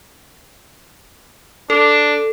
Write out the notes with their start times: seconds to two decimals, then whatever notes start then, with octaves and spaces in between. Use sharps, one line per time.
1.70 D4 A4